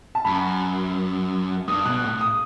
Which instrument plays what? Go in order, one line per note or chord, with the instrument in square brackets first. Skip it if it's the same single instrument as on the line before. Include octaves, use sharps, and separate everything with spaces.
[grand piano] A5
[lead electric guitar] F#2 [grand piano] B5
[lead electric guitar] G2 [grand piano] D#6
[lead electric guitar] B2 [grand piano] F#6
[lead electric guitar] A2
[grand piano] D#6